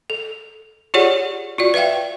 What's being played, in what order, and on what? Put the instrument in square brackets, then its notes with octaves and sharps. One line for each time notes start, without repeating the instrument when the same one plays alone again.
[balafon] A4
F4 G4 G#4 C#5 D5 F#5
F4 F#4 D5
B4 D5 E5 F5 G5